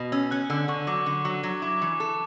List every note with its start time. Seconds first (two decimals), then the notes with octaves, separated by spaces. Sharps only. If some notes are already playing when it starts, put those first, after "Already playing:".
Already playing: B2
0.12 C#4 E6
0.31 C#4 F#6
0.50 D3 E6
0.68 D3 C#6
0.87 F#3 D6
1.06 D3
1.24 F#3 C#6
1.43 F#3
1.62 E4 D6
1.82 E3
2.00 A4